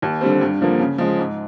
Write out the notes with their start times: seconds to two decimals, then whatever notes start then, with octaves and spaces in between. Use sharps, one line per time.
0.02 D#2
0.21 D3 G3 C4
0.41 G2
0.61 D3 F3 A#3
0.79 C#3
0.98 F3 G#3
1.18 G#2